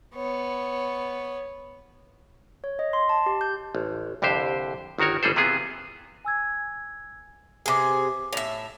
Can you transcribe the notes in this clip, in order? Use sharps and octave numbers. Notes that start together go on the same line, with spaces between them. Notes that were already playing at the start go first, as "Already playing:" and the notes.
B3 C#5
C#5
D#5
C6
A5
G4
G6
A1
C2 F2 D3 G4 C5
G1 D#3 F#4 A#4 C#5
G1 G3 G#4 A4 C5
C3 E3 B3 F4 G#4
G#5 E6 G#6
C3 G#4 B4 D6
A2 E5 F7